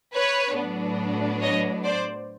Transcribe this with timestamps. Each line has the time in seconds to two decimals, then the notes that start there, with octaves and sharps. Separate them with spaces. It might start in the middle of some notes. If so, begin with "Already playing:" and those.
0.15 B4 C#5
0.57 A2 F#3 B3 D4
1.42 C#5 D#5
1.84 C5 D5